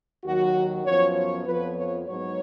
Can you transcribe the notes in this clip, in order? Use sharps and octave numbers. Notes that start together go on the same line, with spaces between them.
D#2 D#3 F#3 F#4
F#2 F3 B3 C#5
C#5
F2 F3 B3 B4
C#5
G#2 F#3 B3 C#5